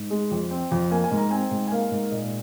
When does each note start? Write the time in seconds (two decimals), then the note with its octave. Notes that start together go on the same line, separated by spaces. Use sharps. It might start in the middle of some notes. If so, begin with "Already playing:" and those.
Already playing: G#2
0.10 G#3
0.31 F2
0.51 C4
0.72 F2
0.91 A#3 G#5
1.04 G#5
1.11 G#2
1.17 A#5
1.31 C4 G#5
1.51 G#2
1.67 G#5
1.72 A#3 F5
1.91 G#2
2.11 A#2 D#5